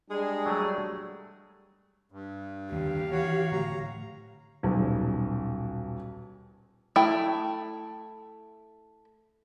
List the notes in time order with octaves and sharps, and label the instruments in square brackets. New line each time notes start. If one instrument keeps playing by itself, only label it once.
[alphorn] G3 [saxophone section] G#3 G#4 [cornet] D4
[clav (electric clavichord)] F#3 A3
[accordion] G2
[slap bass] D#2 D3 [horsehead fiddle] G4 F5
[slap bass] E3 [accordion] F#4 C#5
[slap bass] A2 D3 F3 [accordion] A#5
[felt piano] D#1 B1
[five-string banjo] A3 E4 G5